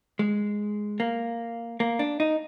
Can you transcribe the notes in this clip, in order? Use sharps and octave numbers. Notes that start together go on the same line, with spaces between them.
G#3
A#3
A#3
D4
D#4